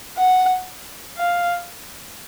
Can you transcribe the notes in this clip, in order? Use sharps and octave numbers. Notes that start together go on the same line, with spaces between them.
F#5
F5